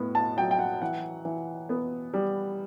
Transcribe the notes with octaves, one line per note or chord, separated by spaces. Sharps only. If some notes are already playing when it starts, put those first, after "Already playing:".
Already playing: A2 B3
A5
F#3 G5
G5
F#5
E3 F#5
E3
B3
G3